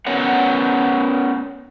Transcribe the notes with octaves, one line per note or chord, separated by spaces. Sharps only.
B3 C#4 A#4 C#5 F#5